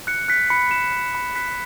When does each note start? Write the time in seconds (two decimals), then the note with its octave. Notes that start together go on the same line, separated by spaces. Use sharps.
0.07 F#6 C#7
0.28 F#6 B6
0.50 B5 C#7
0.71 B5 E7
0.92 F#6
1.15 B5
1.35 F#6 B6